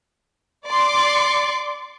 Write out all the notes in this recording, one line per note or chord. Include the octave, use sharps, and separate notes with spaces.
D5 C6 D6